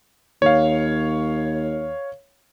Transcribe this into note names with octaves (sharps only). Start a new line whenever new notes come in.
D#2 C#5 F5